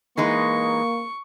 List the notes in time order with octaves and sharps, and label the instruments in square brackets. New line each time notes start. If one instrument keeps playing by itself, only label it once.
[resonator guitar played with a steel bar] E3 G#3 D#4 [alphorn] A#3 [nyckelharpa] C#6